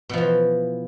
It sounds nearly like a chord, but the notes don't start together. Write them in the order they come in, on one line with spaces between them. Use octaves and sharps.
B2 F3 E3